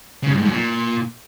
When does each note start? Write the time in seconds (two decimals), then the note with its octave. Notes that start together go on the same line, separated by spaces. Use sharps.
0.23 C#3
0.30 G2
0.37 G#2
0.45 F#2
0.52 A#2